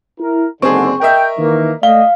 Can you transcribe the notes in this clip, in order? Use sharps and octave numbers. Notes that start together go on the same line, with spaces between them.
E4 A#4
F#1 G#2 D3 C4 G#4 C#6
A#4 D#5 E5 G5
D#3 E3 A#3
A3 D5 D#5 F5 G7